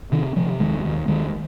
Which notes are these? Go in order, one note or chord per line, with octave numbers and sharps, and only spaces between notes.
C3 D#3
C3 F3
D#2 D#3 G#3
D#2
D#2 D#3 G#3